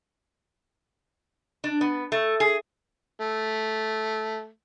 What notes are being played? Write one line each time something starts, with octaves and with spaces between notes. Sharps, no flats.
D4
B3
A3
G#4
A3